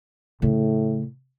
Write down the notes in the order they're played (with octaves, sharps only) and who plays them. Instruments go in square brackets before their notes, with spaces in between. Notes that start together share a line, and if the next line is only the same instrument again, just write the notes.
[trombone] A2 [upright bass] C#3 A3